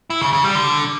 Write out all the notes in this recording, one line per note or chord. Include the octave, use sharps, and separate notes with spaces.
E4
C#3
C#3
G3
D3